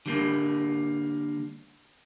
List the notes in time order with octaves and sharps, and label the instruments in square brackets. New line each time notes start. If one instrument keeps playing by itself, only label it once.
[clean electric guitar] D3 G3 A#3